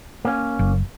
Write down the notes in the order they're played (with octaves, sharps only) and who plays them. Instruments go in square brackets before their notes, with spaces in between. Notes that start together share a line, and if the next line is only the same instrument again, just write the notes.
[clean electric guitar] A#3 C#4
[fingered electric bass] F#1